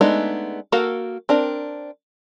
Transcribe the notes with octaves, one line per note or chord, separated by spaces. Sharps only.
G#3 A3 B3 D4 D#4
A#3 F#4 A4 A#4 F5
C4 D4 A#4